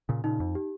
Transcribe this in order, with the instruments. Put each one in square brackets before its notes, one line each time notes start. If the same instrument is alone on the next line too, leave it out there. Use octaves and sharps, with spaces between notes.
[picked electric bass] A#2 C#3
[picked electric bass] A#2 C#3 [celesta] D#4
[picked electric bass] F2
[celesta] G4